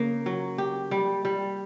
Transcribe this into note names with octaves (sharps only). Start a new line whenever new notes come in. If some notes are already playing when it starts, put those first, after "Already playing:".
Already playing: C#3 A#3
F#3
G4
G3
G3